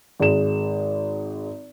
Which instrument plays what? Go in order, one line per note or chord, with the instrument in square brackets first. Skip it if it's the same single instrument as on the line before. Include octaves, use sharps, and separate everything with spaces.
[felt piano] G#1 G#3 E7